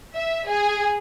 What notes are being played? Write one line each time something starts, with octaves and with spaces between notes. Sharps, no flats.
E5
G#4